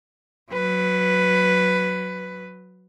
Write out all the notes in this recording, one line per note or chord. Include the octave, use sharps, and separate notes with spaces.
F#3 B4